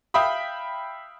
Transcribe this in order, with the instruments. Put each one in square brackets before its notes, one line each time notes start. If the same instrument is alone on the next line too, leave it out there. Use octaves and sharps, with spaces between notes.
[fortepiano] E5 F5 G5 B5 D#6